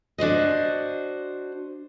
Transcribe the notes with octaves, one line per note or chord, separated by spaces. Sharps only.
D4 F#4 C5 D#5